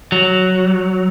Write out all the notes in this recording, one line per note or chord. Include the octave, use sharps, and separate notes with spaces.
F#3